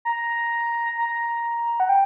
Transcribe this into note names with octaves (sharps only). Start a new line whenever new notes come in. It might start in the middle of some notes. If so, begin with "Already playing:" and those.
A#5
A#5
F#5
G5